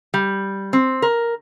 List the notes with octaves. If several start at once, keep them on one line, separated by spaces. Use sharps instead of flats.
G3
C4
A#4